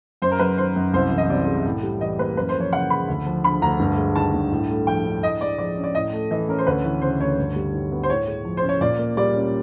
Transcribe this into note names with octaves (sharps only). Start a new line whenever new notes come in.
F#2 C5
A#4
F#3 B4
D#3 C5
F#2
C2 C5
E3
D#5
C3 D5
G#3
A2
G3
E3 D#5
A#3 B4
F#2 B4
C5
F3
C#5
C#3 F#5
G#3 B5
D2
F3
D3 B5
D2 A#5
G2
G#3
D#3 A5
G2
A2
A3
F3 G5
D4
A2 D#5
G#3 D5
F3 D5
C#4
D5
A2 D#5
A3
E3 D#5
C#4 A#4
C5
D2 B4
E3
C#3 C5
D2 C#5
G2
G3
D#3
B3
C5
A2 C#5
G#3
F3
C5
C#4
C#5
A#2 D5
A#3
G3 D5
C#4